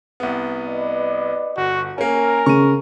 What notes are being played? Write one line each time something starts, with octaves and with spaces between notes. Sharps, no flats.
C2 B3
B4 D5 D#5
G1 F#4
A#3 C#4 A#4 G#5
C#3 C#6 D#7